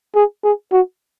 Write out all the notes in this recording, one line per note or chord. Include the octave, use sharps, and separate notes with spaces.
G#4
G#4
F#4